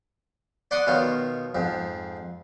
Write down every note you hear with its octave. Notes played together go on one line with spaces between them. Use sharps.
D5 F#5 C6 D6 D#6
B2 D#3 F4 C#5
F2 G#2